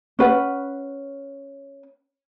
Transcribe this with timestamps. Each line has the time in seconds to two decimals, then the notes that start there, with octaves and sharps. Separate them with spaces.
0.19 C#4 B4 F#5